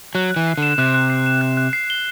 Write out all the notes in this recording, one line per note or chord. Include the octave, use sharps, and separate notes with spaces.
F#3 F#6
F#6
E3
C7
D3 E7
C3 F#6
F#6
C7
E7
F#6
F#6
C7
G7